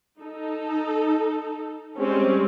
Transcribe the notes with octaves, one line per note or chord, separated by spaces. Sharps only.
D#4 A4
G3 G#3 C4 C#4 G4